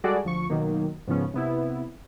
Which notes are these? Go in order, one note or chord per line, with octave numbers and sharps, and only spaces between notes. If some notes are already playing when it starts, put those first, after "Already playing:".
G3 G#3 F#4 G#4 A4 D5
D2 F3 C#6
B2 D#3 F#3 A#3
G#2 C#3 F3 B3 C#4
C3 B3 E4